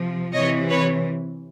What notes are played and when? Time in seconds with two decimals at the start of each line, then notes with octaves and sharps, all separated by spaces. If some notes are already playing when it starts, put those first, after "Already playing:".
Already playing: C3 F3
0.32 C3 E3 C#5 D#5
0.69 B4 C#5